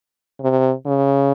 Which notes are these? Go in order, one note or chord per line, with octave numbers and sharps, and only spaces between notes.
C3
C#3